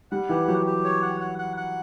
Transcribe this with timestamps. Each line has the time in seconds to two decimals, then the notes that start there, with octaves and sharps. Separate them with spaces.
0.11 G3 F#5
0.29 E3 G4
0.47 F#3 G4
0.66 G4
0.84 C#5
1.02 F#5
1.20 F#5
1.39 F#5
1.57 F#5